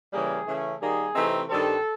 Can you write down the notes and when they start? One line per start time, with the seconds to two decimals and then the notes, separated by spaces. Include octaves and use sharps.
0.12 C#3 E3 G3 A#3 G#4
0.47 C#3 E3 A3 C#4
0.80 D#3 G3 A#3 G#4
1.15 C3 E3 A3 C4 D#4
1.49 G2 D#3 G3 C4 A4